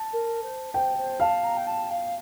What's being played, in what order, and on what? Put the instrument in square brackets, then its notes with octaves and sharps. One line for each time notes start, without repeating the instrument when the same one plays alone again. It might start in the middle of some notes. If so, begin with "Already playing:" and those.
Already playing: [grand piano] A5
[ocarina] A#4
C5
[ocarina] C5 [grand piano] G5
[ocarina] C5
[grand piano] F5 [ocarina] A5
[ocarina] A#5
G5
A5
F5